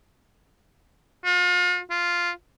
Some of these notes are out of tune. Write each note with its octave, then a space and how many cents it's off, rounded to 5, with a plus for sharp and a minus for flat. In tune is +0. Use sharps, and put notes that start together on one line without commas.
F4 +40
F4 -5